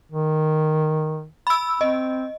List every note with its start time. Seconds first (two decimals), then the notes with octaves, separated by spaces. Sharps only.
0.12 D#3
1.47 B5 E6
1.81 C4 D#5